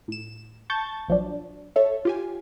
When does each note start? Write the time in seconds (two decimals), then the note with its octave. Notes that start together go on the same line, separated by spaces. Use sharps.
0.08 A2 E7
0.70 A5 C#6 G6 A6
1.08 A#1 F3 F#3 D4
1.76 A4 C#5 E5
2.05 F4 G4 G#5